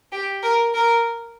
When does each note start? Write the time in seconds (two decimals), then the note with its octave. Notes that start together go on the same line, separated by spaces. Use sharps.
0.12 G4
0.43 A#4
0.74 A#4